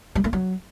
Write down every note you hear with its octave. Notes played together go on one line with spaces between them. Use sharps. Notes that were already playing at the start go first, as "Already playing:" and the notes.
G3
A3
F#3